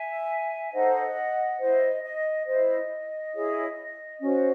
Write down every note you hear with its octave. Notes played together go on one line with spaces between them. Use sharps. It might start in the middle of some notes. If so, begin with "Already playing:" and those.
Already playing: E5 G#5
D#4 A4 C5 D#5 F#5
E4 C5 D#5
D#5
E4 C5 D#5
E4 G#4 C#5
C#4 F#4 C5